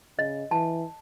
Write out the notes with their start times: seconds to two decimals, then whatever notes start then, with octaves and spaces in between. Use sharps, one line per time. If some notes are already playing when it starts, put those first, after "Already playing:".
0.19 C#3 D#5
0.51 E3 A5